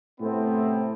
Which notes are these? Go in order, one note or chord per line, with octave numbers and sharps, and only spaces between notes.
A2 C3 A3 B3 C4